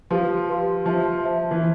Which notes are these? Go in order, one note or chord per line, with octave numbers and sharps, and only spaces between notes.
F3 G4 B4 F5 C6
G4 B4 F5 C6
F3 C5 E5 A5
C5 E5 A5
E3